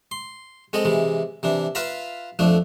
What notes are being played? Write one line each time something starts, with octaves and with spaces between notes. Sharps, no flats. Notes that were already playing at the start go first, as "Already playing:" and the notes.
C6
G#3 C4 A4 D#5
C3 E3 G#3
C3 E3 D4
F4 B4 E5 F5 A#5 B5
F2 F3 A3 D4